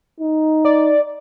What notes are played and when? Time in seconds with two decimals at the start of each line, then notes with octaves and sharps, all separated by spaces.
0.20 D#4
0.65 D5